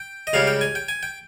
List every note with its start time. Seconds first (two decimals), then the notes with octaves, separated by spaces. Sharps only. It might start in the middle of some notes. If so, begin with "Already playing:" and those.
Already playing: G5
0.27 D#5
0.33 C#2 C#3 G3 C#4 F5
0.47 G5
0.61 G#5
0.75 G5
0.88 G#5
1.03 G5